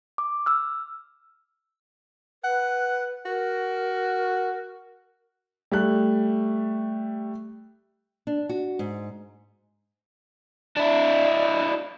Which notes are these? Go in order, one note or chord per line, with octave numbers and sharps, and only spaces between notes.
D6
E6 F6
B4 F#5
F#4 A#4
G3 A3 F#6
D4
F#4
G#2
D4 E4